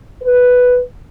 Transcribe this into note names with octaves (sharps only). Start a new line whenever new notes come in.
B4